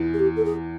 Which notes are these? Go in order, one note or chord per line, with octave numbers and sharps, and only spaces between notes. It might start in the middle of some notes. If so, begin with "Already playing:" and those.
Already playing: E2 E3
G#4
G4
A4
G#4